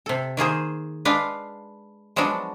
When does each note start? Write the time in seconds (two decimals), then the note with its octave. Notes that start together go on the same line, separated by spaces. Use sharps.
0.06 C3 A4
0.37 D#3 A#3 G#4 C5
1.05 G#3 D4 B4 F5
2.16 F3 F#3 G#3 B3 D4 F#4